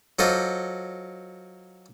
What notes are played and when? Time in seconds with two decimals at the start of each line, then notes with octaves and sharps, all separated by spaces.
0.19 F#3 F4 A4 C5 D#5 D6